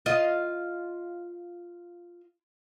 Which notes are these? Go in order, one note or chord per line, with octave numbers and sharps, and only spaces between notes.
F4 D#5